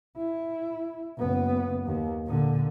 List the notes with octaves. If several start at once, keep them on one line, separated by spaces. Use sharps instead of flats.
E4
F#1 B3
D#2
A#2 D3